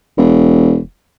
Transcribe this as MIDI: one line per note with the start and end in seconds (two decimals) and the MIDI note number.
0.18 0.79 28